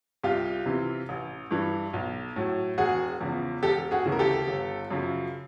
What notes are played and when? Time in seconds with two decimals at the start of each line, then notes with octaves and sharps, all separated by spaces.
0.24 C2 F4 G4
0.66 C3 E3
1.09 A1
1.51 G2 E3
1.93 B1
2.36 A2 F#3
2.78 E1 F#4 G#4
3.21 E2 C#3 F3
3.62 E1 G4 A4
3.91 F#4 G#4
4.05 D2 C#3 E3
4.12 A#4
4.19 G4 A4
4.48 G1
4.91 F#2 C#3 F3